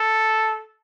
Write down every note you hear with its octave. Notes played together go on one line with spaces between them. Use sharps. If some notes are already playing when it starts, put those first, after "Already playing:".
Already playing: A4